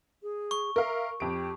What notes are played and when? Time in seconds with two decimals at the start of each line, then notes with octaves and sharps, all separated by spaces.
0.23 G#4
0.51 C#6
0.76 A#4 E5 F5
1.20 F2 G4 D7